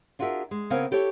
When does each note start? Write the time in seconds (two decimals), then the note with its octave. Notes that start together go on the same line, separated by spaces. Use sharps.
0.19 D4 F4 F#4 G#4 A#4 E5
0.51 G#3
0.70 C#3 B3 C4 A#4 F5 G#5
0.91 E4 G4 A4 C#5